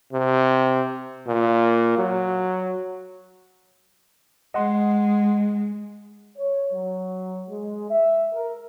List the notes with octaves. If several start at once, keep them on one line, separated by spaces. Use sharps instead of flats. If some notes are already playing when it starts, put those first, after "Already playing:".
C3
A#2
F#3
G#3 D#5 F#5 C6
C#5
F#3
G#3
E5
A#4